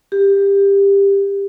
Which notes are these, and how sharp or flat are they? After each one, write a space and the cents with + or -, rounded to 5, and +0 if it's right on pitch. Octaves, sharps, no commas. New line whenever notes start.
G4 +20